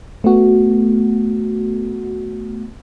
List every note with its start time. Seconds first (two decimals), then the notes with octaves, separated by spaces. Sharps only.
0.24 A3 B3 F#4